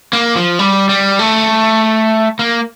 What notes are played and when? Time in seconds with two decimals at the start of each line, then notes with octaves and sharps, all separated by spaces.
0.13 A#3
0.36 F3
0.59 G3
0.89 G3
1.19 A3
2.39 A#3